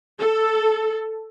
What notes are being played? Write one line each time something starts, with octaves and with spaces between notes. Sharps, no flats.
A4